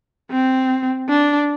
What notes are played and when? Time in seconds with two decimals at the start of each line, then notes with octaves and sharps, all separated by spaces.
0.31 C4
1.09 D4